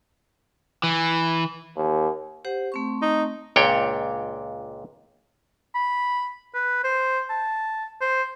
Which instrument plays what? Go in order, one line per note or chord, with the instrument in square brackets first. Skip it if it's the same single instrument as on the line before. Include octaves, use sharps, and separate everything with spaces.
[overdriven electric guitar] E3
[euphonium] D#2
[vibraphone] G4 C5 F#5
A3 C4 C#6
[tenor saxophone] D#4
[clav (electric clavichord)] C#2 A#2 D4 C#5 G5
[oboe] B5
B4
C5
A5
C5